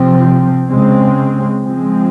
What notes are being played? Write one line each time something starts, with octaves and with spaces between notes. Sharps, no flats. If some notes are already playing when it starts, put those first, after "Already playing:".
Already playing: C3 F3 C4
C#3 G#3 C4
F3 G#3 C4